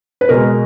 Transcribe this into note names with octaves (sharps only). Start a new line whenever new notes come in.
B4
B2 G#3 A#4